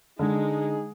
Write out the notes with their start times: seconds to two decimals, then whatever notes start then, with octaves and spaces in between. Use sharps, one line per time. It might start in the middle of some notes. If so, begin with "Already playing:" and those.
0.19 D3 G#3 D#4 G#4